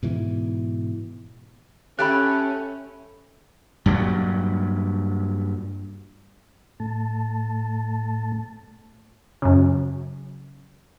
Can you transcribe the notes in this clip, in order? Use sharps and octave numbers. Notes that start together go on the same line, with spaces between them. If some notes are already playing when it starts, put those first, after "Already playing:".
G#2 B2 E3
A3 C#4 G4 E5 B5 F#6
G2 A#2 F#3
A2 A3 A5
F#2 C#3